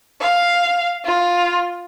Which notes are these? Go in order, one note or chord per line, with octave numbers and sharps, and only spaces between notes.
F5
F4